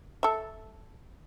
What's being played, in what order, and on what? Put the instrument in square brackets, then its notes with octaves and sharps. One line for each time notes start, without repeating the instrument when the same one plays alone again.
[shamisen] A4 E5